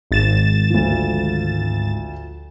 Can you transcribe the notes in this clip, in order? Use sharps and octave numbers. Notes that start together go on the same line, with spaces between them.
G#1 A6 E7
D2 F3